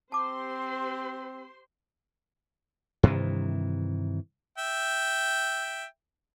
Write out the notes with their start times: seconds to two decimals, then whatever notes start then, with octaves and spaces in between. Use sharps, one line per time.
0.12 C4 G4 C5 A5 C6 D6
3.03 G2 C3 D#3 E3
4.58 E5 G5